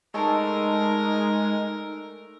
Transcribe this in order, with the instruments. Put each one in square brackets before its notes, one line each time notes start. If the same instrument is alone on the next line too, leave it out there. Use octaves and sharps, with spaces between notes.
[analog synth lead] G#3 [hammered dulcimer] A3 A4 D5 [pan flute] D#4 [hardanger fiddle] A#4